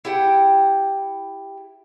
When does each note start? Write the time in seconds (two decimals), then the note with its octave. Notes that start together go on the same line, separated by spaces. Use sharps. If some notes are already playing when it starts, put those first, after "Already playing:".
0.05 E4 G4 F#5 G5